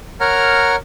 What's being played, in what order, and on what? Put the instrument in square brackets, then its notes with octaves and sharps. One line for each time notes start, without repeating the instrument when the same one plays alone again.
[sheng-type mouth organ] A#4 C#5 F#5 A#5 F6